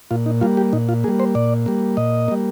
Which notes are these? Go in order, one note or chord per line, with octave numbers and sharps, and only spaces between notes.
A#2 F4
D#4
G3 A#3 F4
G4
A#2 D#4
F4
G3 A#3 G#4
C5
A#2 D5
G3 A#3
A#2 D#5
G3 A#3